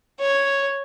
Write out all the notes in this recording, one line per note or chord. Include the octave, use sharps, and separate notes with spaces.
C#5